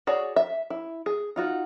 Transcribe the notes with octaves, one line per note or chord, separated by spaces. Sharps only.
F#4 G#4 C#5 D5
E5
E4
G#4
D#4 F4 F#4